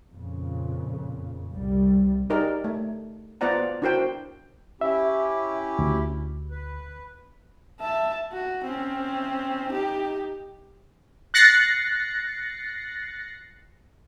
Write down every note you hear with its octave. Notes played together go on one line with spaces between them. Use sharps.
F2 A#2 C#3
C2 G3
D#4 G4 G#4 A#4 D5
A3
B3 F4 C5 D5 F#5 A#5
D4 E4 F#4 A#4 C5 G5
C#4 E4 G4 E5
D2
B4
E5 A5
F#4
C4 C#4
D#4 G4
F#6 A6 A#6 C7 C#7